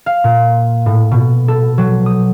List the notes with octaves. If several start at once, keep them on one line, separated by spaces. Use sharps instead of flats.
F5
A#2
A2
B2
A4
F#3
D#6